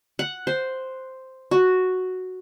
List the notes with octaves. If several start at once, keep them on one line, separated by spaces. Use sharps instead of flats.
F#5
C5
F#4